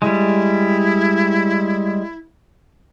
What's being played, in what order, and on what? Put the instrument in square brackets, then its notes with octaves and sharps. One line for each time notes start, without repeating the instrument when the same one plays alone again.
[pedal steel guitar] G3 G#3 [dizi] E4